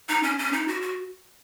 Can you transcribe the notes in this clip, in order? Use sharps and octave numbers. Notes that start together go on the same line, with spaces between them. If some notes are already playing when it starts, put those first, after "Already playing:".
D#4
C#4
C#4
D#4
F#4
F#4